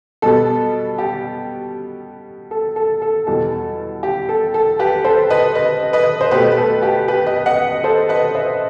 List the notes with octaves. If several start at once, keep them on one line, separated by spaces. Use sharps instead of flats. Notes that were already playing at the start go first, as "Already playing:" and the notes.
B2 G3 B3 A4
G4
A4
A4
A4
E2 B2 G3 A4
G4
A4
A4
G4 B4
A4 C5
B4 D#5
B4 D#5
B4 D#5
C5
B2 A3 G4 B4
B4
A4
G4
G4 B4
B4 D#5
D#5 F#5
A4 C5
B4 D#5
C5 E5